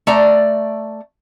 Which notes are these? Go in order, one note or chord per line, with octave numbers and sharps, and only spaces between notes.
A3 D5 A#5